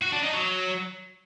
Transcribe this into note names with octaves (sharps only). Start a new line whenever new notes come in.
F#4
D4
D#4
F#3